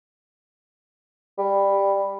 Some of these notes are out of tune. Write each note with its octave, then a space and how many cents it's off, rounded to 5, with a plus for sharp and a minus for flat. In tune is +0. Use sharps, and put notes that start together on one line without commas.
G3 +10